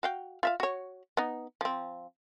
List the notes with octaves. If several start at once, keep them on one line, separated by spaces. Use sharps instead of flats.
F#4 F5 G5
F4 E5 F5
F#4 C#5
B3 D#4
F3 C4